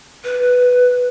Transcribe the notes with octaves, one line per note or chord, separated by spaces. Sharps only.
B4